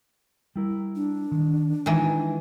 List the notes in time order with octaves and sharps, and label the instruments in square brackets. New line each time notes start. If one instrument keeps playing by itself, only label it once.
[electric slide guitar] G3 E4 A#4
[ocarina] D4
[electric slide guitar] D#3
[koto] D#3 E3 [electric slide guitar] G#3 F4